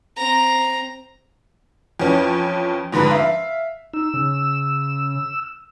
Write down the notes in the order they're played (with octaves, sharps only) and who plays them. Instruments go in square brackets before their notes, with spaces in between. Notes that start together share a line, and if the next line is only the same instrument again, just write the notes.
[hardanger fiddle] C4 A#5
[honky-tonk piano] F2 E3 C#4
F2 G#2 D3 B4 B5
E5 F5
[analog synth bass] D#4 [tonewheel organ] E6
[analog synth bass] C#3